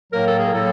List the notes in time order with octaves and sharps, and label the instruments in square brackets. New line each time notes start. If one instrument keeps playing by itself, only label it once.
[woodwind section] A2 F#3 A#3 A#4
A4
G#4
A2 F#3 A#3 A4